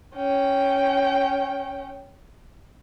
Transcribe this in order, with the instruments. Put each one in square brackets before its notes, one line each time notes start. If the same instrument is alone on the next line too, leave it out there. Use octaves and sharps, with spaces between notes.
[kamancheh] C#4 G5